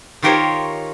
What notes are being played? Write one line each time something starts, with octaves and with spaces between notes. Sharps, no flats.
D#3 F4 G4 A#4 C5 C#5